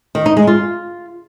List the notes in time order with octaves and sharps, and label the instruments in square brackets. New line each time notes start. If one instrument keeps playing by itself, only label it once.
[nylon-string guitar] D#3
D#4
G#3
F4